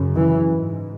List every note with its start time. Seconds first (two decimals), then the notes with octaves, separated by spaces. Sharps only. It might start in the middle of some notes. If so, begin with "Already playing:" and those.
Already playing: F#2 C#3
0.14 E3
0.51 G#2